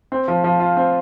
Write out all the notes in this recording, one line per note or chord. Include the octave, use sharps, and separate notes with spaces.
C4
F3
F3
F4
C4